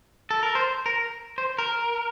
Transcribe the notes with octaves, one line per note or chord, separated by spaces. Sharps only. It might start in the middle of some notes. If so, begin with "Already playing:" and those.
A4
A#4
C5
A#4
C5
A#4